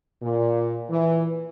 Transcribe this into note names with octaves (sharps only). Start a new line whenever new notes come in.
A#2
E3